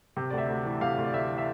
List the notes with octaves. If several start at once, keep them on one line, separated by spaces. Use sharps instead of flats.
C3
D2 D5
E5
D2
E3
C3 F5
D2
D5
D2 E5
E3
E5